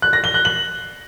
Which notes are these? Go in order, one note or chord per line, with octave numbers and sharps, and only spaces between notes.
F#6
A#6
G7
F#6
F#7